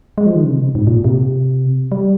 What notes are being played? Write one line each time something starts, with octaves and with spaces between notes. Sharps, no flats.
G#3
F3
D#3
C#3
C3
G#2
A#2
C3
G3